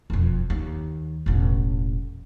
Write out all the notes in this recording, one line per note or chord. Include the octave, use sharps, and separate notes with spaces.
E1 F2
D#2
E1 A1